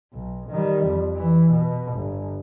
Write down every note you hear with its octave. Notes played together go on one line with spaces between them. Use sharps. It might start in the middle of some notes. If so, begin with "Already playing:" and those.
B1
D#3 G3
F2
E3
B2
G1